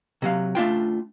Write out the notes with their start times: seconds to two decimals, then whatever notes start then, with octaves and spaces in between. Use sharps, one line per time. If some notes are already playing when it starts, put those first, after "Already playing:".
0.22 C3 F#3 F5
0.55 A3 D4 F4 G5